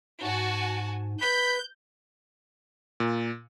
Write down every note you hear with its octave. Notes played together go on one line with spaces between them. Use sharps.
G#2 F#4 G#5 A5
B4 B5 G6
A#2